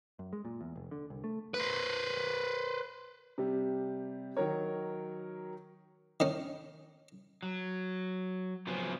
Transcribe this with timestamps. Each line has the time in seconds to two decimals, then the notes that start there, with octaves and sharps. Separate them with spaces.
0.19 F#2
0.33 G#3
0.45 A#2
0.61 E2
0.76 F1
0.91 D3
1.10 C2
1.24 A3
1.54 B4 C5
3.38 C3 G3
4.37 D#3 F#3 F#4 A#4 C#5
6.20 D#3 C#4
7.43 F#3
8.67 C#3 F3 F#3 B3